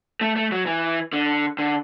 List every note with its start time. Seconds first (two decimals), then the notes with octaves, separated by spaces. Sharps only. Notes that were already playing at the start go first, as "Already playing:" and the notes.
0.21 A3
0.36 A3
0.52 F#3
0.66 E3
1.13 D3
1.58 D3